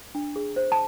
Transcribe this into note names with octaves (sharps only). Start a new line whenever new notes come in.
D4
G#4
C5
A5